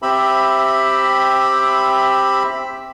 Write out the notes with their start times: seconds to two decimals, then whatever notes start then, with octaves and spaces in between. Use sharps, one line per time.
0.02 C4 G4 E5 B5